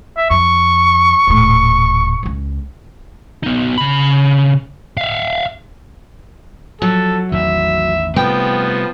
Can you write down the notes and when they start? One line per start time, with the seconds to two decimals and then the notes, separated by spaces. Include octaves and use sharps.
0.17 E5
0.30 F2 C#6
1.27 D#1 A2
2.23 C#2 C#4
3.43 B3 D#4
3.78 C#3 B5
4.97 E5 F5
6.82 F3 F#3 A4
7.32 A1 E2 D#3 E5
8.16 C3 F3 G3 A3 B3 G5